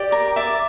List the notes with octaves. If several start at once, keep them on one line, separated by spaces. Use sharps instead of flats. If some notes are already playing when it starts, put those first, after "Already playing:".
Already playing: G4 D5
A#4
D5 E5